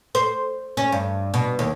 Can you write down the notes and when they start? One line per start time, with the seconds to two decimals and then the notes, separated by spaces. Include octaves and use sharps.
0.15 C5
0.77 C#4
0.92 G2
1.34 B2
1.59 D#2